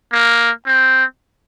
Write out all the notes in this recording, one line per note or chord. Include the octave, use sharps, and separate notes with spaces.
A#3
C4